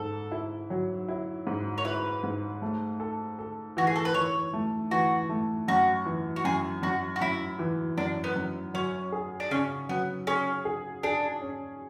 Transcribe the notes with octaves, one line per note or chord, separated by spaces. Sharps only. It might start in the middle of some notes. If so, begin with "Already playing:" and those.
Already playing: G#2 A4
E4
F#3
E4
G#2
C#5
E4 B4
G#2
A3
A4
A4
E3 F#4
G#4
A4
B4
E3 C#5
A3
E3 F#4
A3
F#2 F#4
E3
F#4
F#2 G#4
F#2 F#4
F#4
F#2 E4
E3
F#2 D4
B3
F#2
F#3 C#4
G#4
D4
C#3 C#4
F#3 B3
C#4 G#4
G#4
D4 G#4
C#4